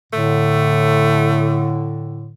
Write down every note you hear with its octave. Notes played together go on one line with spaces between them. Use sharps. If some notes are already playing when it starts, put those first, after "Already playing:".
A2 D3 A3